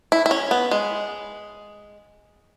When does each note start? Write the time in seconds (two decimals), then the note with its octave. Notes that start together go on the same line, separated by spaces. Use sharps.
0.12 E4
0.26 E4
0.31 C#4
0.51 B3
0.71 G#3